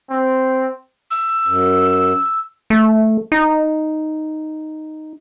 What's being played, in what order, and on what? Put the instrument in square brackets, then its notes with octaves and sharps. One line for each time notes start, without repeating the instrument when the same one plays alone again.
[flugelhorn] C4
[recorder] E6
[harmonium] F#2
[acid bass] A3
D#4